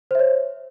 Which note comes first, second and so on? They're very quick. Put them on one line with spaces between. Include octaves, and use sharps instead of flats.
C5 E5 C#5